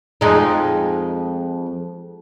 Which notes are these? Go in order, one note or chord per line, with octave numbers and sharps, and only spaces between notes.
F2 G#3 D#4